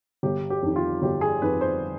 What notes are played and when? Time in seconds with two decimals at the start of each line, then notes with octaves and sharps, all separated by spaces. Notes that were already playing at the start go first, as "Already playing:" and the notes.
0.23 G1 G4
0.50 G4
0.62 F2 D#3
0.76 F4
1.02 G1 G4
1.21 G#4
1.42 F2 D#3 B4
1.61 C5